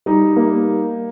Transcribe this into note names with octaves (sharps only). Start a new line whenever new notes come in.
G3 D#4
A#3